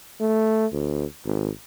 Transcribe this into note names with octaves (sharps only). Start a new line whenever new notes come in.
A3
D2
G#1